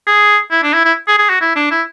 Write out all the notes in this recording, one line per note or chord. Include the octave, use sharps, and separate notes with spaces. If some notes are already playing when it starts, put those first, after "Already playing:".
G#4
E4
D4
E4
E4
G#4
G#4
F#4
E4
D4
E4